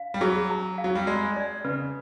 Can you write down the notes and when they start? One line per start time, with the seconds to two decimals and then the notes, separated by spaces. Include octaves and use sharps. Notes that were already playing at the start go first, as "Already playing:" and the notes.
Already playing: F5
0.14 G3
0.21 F#3 G#4
0.50 A#5
0.78 F5
0.84 F#3
0.95 G3
1.07 G#3 D5
1.37 D5
1.64 C#3 B4